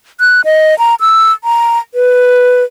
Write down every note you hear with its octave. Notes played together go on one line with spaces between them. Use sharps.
F#6
D#5
A#5
E6
A#5
B4